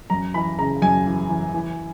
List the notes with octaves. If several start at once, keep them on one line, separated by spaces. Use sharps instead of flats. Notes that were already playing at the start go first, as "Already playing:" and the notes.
F#2 A#5
E3 B5
C#3 A#5
F#2 G#5
E3
E3
E3